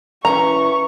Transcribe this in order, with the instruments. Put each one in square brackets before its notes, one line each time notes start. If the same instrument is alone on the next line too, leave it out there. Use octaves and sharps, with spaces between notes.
[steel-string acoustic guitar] E3 C#4 [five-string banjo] A#5 [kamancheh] C#6